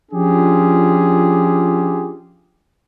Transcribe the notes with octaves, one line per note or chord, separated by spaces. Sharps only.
F3 C#4 D4 F4 G4 G#4